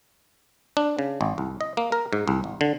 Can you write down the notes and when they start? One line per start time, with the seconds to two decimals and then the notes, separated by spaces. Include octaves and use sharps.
0.77 D4
0.99 C#3
1.21 G#1
1.38 C2
1.61 D#5
1.77 A#3
1.92 A#4
2.13 G#2
2.28 C2
2.44 G#1
2.61 D3